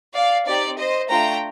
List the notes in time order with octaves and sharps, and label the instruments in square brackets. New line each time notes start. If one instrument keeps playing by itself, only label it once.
[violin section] D5 F5
C4 D#4 G4 D5
C5 D#5
A3 D4 F4 G5 A#5